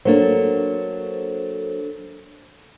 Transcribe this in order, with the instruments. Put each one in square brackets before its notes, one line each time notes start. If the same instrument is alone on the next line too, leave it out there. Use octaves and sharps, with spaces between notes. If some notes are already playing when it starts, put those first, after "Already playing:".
[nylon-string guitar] F#3 A#3 [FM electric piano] D4 A4 C5